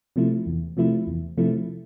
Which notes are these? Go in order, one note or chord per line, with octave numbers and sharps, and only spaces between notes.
C3 F3 A3 E4
E2
C3 F3 A3 E4
E2
C3 F3 A3 E4